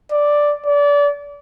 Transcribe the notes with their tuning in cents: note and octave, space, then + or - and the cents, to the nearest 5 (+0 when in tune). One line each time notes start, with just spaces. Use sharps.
D5 +0
D5 -30